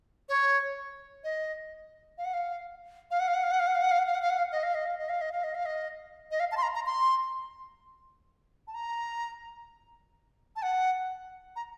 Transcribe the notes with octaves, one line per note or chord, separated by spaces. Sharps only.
C#5
D#5
F5
F#5
F5
F5
F#5
F5
F#5
F5
F#5
F5
F#5
F5
F#5
F5
F#5
F5
F#5
F5
F#5
F5
D#5
F5
D#5
F5
D#5
F5
D#5
F5
D#5
F5
D#5
D#5
F5
A5
C6
A#5
A#5
C6
A5
A#5
A5
F#5
A#5